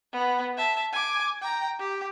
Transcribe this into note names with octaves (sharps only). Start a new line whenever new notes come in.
B3
E5 A5
G#5 D6
G5 A#5
G4